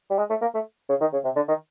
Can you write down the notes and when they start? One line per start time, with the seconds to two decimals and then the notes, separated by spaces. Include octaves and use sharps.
0.10 G3
0.19 G#3
0.30 A3
0.42 A#3
0.55 A3
0.90 C#3
1.01 D#3
1.13 C#3
1.25 C3
1.36 D3
1.48 D#3